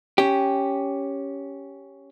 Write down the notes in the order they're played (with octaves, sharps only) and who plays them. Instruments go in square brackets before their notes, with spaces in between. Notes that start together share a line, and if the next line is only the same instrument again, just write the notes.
[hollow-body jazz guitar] C#4 G4